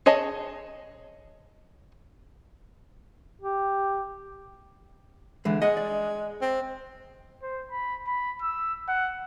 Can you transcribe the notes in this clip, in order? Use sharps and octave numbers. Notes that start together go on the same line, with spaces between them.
G#4 C#5 D#5 A5
G4
D3 E3 G#3
G#3 D#5 F#5
D5
C4
C5
B5
B5
E6
F#5